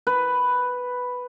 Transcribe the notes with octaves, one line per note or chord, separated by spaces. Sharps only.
B4